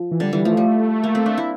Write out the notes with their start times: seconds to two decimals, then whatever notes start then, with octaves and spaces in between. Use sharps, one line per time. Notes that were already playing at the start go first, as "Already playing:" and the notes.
Already playing: F3
0.11 E3
0.20 D3 G3
0.33 E3 G3
0.45 F3 A3
0.57 G3
1.03 A#3
1.15 C4
1.26 D4
1.38 E4